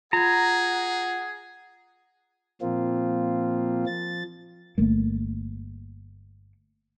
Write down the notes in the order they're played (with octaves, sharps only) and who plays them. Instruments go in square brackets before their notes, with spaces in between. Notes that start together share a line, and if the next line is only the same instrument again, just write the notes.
[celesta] F4 G#6 [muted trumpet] G#4 [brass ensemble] F#5 [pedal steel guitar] A#5
[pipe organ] A#2 F3 A#3 C4 F4
F3 A6
[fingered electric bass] G1 A3 A#3